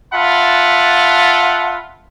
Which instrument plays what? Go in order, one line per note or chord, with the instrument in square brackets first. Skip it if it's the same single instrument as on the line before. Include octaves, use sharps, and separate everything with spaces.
[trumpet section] F4 E5 F#5 A5 B5